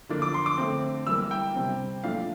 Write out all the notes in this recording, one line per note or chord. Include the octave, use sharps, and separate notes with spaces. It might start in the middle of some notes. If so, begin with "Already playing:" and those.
D3 F3 A#3 D4
D6
C6
D6
D3 A3 C4
E3 G3 A#3 E6
G5
C3 G3 C4
A#2 F3 A3 D4 F5